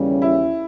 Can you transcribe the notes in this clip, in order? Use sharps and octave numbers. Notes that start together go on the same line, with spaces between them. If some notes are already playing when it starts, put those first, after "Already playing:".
Already playing: D#2 C#3 E3 G3 C#4
E4